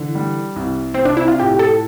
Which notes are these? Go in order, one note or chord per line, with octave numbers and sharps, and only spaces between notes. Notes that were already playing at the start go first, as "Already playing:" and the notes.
Already playing: D3 E3
G3
C2
C3 C4
D4
E4
F4
A2 G4
A4